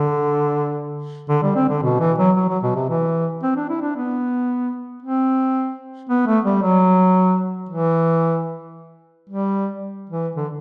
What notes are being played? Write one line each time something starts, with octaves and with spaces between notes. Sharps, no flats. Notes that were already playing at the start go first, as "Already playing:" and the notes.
Already playing: D3
D3
G3
C4
D3
B2
E3
F#3
F#3
F#3
B2
C3
E3
C4
D4
E4
D4
B3
C4
B3
A3
G3
F#3
E3
G3
E3
D3